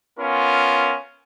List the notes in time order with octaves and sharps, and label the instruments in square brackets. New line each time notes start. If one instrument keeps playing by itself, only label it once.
[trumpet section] B3 C#4 F4 A#4